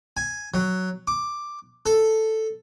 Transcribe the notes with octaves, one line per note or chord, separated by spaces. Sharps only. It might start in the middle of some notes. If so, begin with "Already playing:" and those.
G#5
F#3
D6
A4